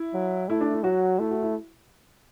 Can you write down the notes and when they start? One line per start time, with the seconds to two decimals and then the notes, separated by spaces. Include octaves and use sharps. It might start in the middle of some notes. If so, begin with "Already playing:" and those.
Already playing: E4
0.14 F#3
0.49 A3 E4
0.61 D4
0.73 E4
0.84 F#3 F#4
1.19 A3 E4
1.31 F#4
1.42 E4